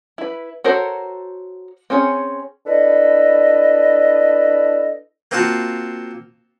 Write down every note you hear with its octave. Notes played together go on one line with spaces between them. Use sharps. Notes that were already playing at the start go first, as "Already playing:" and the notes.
E4 B4
F#4 A4 A#4 C5 C#5
C4 C#4 G#4 C#5
D4 E4 A4 B4 D#5
A#3 C4 F4 F#4 A5